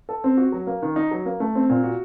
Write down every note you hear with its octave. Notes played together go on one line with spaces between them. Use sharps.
A4
C4
F#4
F#3
A#3
D#3
D#4
F#3
A#3
A3
C4
A#2
F#4